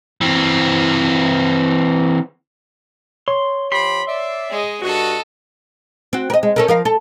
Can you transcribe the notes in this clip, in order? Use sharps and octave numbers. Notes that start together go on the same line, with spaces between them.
E3 C4
C#5 C6
F3 G4 B5 C6
D5 E5
G#3 D#5
G2 F#4 A4 D#5
C4 F#4
A#4 D#5
G#3
C#4 A4 A#4
F3 A#4 F5
A4